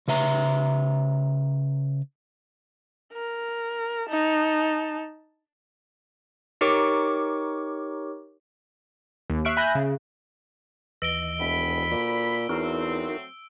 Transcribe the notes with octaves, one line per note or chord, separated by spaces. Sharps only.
C#3 B4 E5 A#5
A#4
D#4 A5
D#4 G4 A#4 C#5 C#6 D6
D#2
E5 C#6 F6 F#6 C7 D7
E5 G#5 B5 F#6 G6 A#6
C#3
D#2 E3 D#5 E6 D7 G7
E1 D2 B5
A#2
E2 F#3 A3 C4 D#4 F#4 A#4